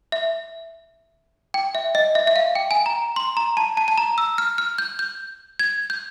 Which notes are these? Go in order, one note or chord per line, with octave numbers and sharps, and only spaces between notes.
E5
G5
E5
D#5
E5
E5
F5
G5
G#5
A#5
C6
A#5
A5
A5
A5
A#5
E6
F6
F6
G6
G6
G#6
G6